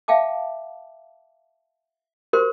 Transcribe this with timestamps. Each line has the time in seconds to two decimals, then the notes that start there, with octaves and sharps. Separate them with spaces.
0.08 E5 F5 G5 A5 D6
2.33 F#4 G4 A#4 C5 C6